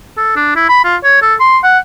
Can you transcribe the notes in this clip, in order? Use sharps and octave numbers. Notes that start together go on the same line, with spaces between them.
A4
D4
E4
B5
F4
C#5
A4
C6
F#5